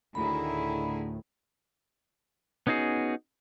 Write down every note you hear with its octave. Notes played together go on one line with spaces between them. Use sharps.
D2 A2 D3 D#3 E4 G#4 B5
B3 C#4 D#4 F#4 G#4